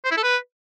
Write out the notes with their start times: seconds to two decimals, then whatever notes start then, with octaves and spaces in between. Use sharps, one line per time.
0.05 C5
0.11 E4
0.17 A4
0.23 B4